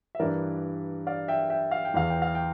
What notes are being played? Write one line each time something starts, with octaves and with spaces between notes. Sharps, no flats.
E5
G2 E3 A#4 D5
D5 F5
E5 G5
E5 G5
F5
G5
E2 E3 F5
G5
F5
G5